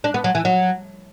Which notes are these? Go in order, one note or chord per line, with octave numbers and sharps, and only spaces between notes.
D4
B3
F#3
E3
F#3